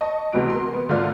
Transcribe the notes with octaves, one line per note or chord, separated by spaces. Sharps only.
D#5 A5 C#6
D2 C3 E3 F#4 D7
A#4 C6
B3
G#1 D3 A3 F4 D5 F6